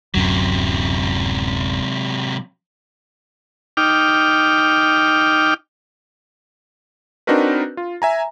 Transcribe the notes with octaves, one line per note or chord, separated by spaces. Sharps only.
D1 F#2 C3 F#3
D#4 G5 D6 F6
C4 D4 D#4 F#4 A#4 B4
F4
E5 G#5 A#5